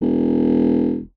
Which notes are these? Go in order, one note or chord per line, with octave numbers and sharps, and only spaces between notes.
E1